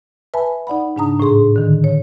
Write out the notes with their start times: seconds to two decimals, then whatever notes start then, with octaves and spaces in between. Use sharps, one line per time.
0.34 B4 E5 G#5 A5 B5
0.67 D#4 D5 F#5 B5
0.96 G#2 C#3 D4 A5 A#5 D#6
1.20 A2 D4 G#4 C6
1.56 D3 D#3
1.84 C#5